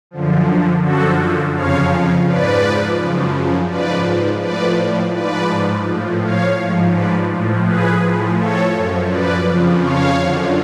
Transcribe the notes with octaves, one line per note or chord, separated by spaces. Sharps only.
F#2 D3 F3
F#2 D3 F3 F#4 A4
F2 C#3 F3 C#5 F5
G#2 F3 B4 D5
F#2 C#3 F3
G#2 F3 B4 D5
A2 F3 B4 D5
G#2 F3 B4 D5
A2 F3
C#5 F5
G#2 F3
B4 D5
A2 F3
G#4 B4
A2 F3
A4 C#5
F#2 F3
B4 D5
F2 C#3 F3
C#5 F5
F#2 D3 F3